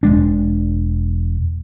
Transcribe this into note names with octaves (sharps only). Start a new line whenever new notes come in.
E1 G#3 D4